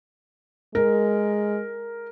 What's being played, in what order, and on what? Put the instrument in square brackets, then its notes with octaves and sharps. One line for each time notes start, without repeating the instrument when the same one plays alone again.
[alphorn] G#3 [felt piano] A#4